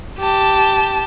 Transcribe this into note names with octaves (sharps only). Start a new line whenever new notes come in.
G4 A5